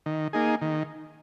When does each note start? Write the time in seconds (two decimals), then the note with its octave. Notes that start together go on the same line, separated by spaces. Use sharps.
0.06 D#3
0.33 A#3 D#4 G#4
0.61 D#3